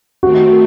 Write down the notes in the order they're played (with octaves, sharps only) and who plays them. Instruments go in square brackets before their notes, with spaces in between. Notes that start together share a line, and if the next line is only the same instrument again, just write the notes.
[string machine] D#3 A3 C4 [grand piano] F#4